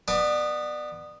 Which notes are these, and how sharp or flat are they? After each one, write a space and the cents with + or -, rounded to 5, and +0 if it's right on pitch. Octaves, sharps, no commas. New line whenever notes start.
B3 +0 D5 +30 G#5 +40